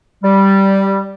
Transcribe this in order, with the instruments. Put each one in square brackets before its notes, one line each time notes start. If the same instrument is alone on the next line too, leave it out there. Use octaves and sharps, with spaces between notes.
[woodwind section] G3